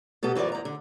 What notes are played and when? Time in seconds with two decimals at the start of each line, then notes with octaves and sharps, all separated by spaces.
0.23 B2 B3 G4 A4
0.35 F#2 E3 F3 A#4 D5
0.52 E2 A#5
0.65 D3